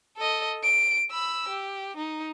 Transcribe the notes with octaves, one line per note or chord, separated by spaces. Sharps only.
A4 D#5
D7
B5 E6
G4
D#4